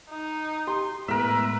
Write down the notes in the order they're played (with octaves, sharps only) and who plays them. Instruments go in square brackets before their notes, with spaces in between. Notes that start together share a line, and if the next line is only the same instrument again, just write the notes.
[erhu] D#4
[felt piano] G4 [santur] C6
[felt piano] A2 G#3 B3 [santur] A#4 E5 [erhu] B4